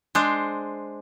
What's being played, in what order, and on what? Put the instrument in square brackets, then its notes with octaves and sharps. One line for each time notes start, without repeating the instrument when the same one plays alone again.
[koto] G#3 D4 C5